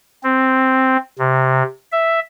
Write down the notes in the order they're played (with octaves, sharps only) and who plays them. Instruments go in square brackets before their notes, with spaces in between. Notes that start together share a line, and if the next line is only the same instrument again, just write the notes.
[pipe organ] C4
C3
E5